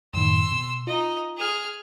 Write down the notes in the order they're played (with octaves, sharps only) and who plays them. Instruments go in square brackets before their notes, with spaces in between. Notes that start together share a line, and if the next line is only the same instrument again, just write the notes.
[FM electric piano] F#2 A2 D#3 [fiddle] C6 E6
[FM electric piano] B2
[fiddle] D#4 D#5 [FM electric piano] F4
[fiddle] G#4 F6